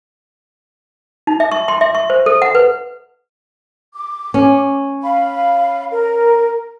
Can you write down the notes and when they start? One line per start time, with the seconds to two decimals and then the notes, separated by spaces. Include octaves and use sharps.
1.27 D#4
1.40 E5
1.52 C#6
1.68 C6
1.81 E5
1.95 C#6
2.10 C5
2.26 A4
2.42 F#5
2.55 B4
3.94 D6
4.34 C#4
5.02 F5 B5
5.91 A#4